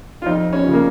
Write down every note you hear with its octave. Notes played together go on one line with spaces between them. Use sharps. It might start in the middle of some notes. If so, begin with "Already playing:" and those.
F4
F2 D#4
C#4
C#3 F3
A#3